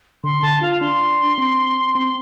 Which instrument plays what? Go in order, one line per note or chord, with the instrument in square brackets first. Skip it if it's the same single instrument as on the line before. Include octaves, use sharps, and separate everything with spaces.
[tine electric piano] D3 [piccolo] C6
[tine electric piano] D3 [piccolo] A5
[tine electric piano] F4 [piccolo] F5
[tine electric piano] D4 [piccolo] C6
[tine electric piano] C4
[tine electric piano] C4 [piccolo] C6